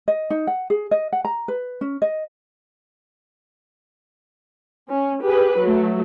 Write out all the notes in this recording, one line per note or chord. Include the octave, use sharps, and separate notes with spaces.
D#5
D#4
F#5
G#4
D#5
F#5
A#5
B4
C#4
D#5
C#4
G4 G#4 B4
F#3 A3